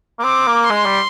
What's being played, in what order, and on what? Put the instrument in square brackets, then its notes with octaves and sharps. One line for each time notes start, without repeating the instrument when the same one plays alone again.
[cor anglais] A#3
[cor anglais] C4 [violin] D6
[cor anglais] A#3
[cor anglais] G#3 [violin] C6
[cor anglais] G3